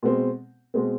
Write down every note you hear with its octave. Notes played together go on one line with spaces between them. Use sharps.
B2 G#3 C4
B2 G#3 C4